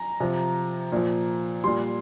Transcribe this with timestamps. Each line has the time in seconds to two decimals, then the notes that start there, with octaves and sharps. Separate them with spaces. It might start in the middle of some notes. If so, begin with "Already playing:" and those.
Already playing: A#5
0.20 C3 F3
0.92 A#2 F3
1.64 A#2 G3 C6